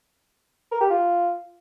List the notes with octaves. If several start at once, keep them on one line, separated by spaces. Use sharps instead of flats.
A#4
G4
F4